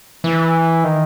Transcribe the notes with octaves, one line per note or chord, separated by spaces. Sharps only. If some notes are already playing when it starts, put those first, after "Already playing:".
E3
D#3